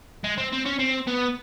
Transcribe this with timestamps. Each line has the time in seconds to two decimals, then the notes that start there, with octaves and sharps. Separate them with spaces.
0.24 G#3
0.38 C4
0.53 C4
0.66 C#4
0.79 C4
1.07 B3